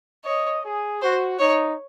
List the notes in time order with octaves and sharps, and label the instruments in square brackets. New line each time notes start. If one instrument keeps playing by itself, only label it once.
[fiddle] C#5 [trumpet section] D#5
[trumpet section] G#4
[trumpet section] F#4 [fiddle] C5
[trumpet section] D#4 [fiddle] C#5